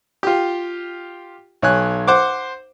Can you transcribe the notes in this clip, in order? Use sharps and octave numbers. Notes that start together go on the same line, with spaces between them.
F4 G4
B1 C#5 G#5 F#6
C5 F#5 D6